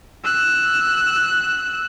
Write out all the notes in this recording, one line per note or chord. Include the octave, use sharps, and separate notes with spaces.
E6 F#6